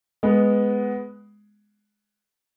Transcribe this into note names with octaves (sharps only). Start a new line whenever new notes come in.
G#3 B3